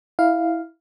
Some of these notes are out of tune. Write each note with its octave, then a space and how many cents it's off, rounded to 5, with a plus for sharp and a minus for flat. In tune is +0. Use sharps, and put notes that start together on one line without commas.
E4 -10 F5 +0